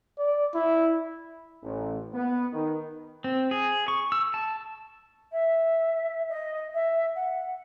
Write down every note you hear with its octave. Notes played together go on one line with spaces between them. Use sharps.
D5
E4
A1
B3
D#3
C4
G#4
C#6
E6
A5
E5
D#5
E5
F#5